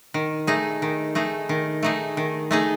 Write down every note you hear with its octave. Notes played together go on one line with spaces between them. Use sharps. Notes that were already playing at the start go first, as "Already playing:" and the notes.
D#3
A3 D#4 G#4
D#3
A3 D#4 G#4
D#3
A3 D#4 G#4
D#3
A3 D#4 G#4